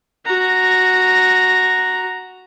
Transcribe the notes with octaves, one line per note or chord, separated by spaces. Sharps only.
F#4 A#5